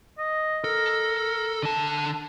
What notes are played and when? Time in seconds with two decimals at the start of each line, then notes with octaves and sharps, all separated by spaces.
0.18 D#5
0.64 A4 A#4
1.63 D3 A5